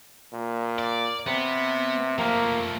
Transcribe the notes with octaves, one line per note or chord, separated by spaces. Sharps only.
A#2
D5
C3 B3
F3 A3 A#3